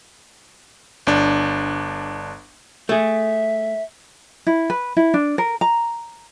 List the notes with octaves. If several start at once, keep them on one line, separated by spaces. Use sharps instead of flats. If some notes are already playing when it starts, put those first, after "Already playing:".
G1 D4
A3 G#4 E5
E4
B4
E4
D4
A#4
A#5